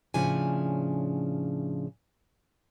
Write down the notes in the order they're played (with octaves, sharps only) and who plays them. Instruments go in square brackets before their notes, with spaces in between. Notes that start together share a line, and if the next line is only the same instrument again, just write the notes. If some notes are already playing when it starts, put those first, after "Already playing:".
[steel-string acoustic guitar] A2 C#3 F3 D4 G#5